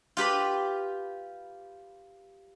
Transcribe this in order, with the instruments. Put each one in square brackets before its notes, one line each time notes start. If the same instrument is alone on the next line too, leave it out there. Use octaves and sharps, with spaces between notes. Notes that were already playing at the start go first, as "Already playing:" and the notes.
[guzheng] F4 G4 B4 B5